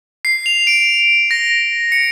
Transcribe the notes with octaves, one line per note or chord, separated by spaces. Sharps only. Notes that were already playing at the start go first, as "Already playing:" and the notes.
C7
F7
D7
A#6
C#7